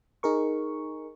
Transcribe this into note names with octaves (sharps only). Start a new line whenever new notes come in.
D#4 G#4 A#4 C#6